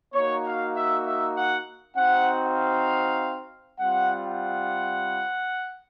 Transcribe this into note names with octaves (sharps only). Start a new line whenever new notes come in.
A#3 D#4 F#4 C#5
F5
E5
E5
F#5
C4 D#4 F#4 F#5
F5
G3 C4 F4 F#5
F#5